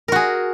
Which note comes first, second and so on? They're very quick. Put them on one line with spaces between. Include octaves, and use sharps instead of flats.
A#4 F#4 G#4